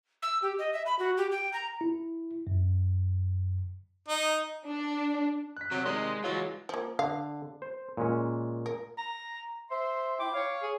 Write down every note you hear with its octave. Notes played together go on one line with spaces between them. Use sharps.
E6
G4
D#5
E5
B5
F#4
G4
G5
A#5
E4
F#2
D#4
D4
F#6 B6
C3 F#3
C3 D#3 G#3 D5 D#5 C6 A#6
E3 F#3 G#3 F4
F3 A#3
D3 F5
C5
A#2 G#3 C#4
A#4
A#5
C5 E5 C6
E4 G5 D6
C#5 F5
G#4